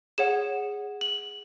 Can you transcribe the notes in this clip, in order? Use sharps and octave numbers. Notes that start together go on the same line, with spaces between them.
G#4 C#5 F#5 E7
F#7